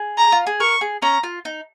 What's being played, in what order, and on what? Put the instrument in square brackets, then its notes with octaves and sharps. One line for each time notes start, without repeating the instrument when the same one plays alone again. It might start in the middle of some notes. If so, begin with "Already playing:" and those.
Already playing: [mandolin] G#4
[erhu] A#5
[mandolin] F4
G#4
[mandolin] A#4 [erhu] C#6
[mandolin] G#4
[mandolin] C#4 [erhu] A#5
[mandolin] F4
D#4